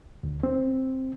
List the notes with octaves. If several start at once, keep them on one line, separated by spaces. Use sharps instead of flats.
D2
C4